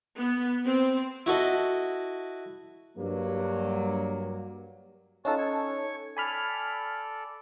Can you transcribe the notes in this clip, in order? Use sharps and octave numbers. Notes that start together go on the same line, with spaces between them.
B3
C4
E4 F#4 A4 D#5
G2 F#3 A#3
C#4 D#4 F4 F#4 A4 A5
C#5 C#6
A4 D5 G#5 B5 F6